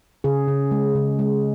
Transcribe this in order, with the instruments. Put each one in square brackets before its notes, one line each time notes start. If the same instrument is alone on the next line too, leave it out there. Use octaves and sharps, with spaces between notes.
[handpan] C#3 G#4
C#3
G#3
C#3
G#3